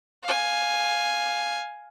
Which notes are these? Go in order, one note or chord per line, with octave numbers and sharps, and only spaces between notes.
F5 G#5